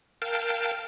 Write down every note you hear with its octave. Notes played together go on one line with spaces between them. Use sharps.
A#4 F5 G5 A5